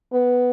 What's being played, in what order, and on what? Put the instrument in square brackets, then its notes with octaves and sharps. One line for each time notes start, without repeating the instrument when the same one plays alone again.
[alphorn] B3